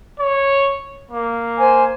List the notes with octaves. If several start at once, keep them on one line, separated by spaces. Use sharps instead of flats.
C#5
A#3
C5 G#5